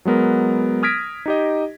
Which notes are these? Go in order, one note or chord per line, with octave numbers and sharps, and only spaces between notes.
F#3 G#3 B3 A#4
D#6 F6 G#6 A#6 B6 D7
D#4 G4 D#5